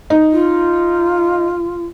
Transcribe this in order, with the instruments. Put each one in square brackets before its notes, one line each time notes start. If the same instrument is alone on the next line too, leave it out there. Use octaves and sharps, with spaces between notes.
[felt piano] D#4
[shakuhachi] F4